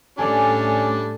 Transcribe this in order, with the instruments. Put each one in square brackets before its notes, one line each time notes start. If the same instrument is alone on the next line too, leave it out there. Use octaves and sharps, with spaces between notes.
[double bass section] A2 A3 [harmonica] G3 D4 [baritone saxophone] C#4 [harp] G#4 A4 D5